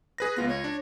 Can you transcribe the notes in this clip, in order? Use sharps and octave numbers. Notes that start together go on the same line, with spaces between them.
G#4 B4 A#6
C#2 B3 F4 A#6
C#5
D4